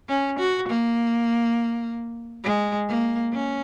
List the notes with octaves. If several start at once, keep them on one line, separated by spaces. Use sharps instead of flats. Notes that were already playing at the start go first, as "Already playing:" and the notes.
C#4
F#4
A#3
G#3
A#3
C#4